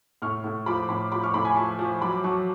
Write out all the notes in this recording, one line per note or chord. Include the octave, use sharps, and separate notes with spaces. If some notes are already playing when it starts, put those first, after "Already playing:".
A2 C#6 F6
A2
F3 B5 D6
A2 B5 D6
F3 B5 D6
C#6 F6
A2 B5 D6
G#5 B5
F3 A5 C#6
F3
F#3 B5 D6
F#3 A5 C#6